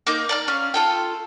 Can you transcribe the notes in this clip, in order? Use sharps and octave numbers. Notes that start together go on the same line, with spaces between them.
A#3 D#4 G6
D5 A#5 F6
C#4 F5
F4 A4 G5